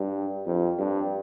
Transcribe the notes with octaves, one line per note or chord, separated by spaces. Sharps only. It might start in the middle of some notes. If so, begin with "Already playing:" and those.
Already playing: G2
F2
G2